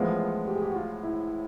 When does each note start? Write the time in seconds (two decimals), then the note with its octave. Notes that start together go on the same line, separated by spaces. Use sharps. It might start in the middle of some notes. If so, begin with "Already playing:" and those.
Already playing: A1 A2 F3 G#3 B3 F4
0.47 G4
0.55 G#4
0.62 G4
0.71 F#4
0.75 F4
1.03 E4